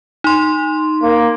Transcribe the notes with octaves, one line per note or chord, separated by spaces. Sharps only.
D#4 C6
A#3